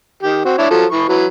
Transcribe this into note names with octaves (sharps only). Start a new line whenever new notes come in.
D#3 G4
C4 F#4
D4 E4 C#5
F3 F#3 A4
E3 B5 C#6
E3 F#3 B4